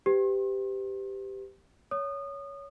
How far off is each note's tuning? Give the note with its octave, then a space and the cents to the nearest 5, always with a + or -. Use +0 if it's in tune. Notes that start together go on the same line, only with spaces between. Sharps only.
G4 +0 B4 +45 C6 +40
C#5 +15 D#6 -30